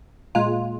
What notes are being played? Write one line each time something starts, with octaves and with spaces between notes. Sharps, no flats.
A#2 G#3 F4